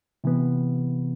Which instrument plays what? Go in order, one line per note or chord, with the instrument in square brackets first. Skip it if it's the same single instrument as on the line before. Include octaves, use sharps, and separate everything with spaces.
[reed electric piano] C3 E3 B3